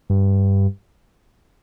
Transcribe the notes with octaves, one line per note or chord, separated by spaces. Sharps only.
G2